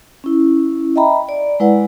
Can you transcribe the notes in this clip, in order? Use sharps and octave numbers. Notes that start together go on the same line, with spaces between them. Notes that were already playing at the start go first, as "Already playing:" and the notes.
C#4 E4
D#5 E5 G5 A#5 B5
D5
G#3 E4 B4 D5 F#5